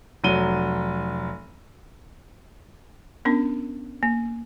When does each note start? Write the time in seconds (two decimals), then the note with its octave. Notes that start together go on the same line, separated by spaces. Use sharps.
0.24 F1 F#3 D#7 G7
3.25 B3 C#4 D4 A#4
4.03 A#3